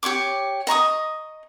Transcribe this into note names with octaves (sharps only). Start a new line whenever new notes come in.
G4 C#5 C#6 D6
D#5 A#5 C#6 D#6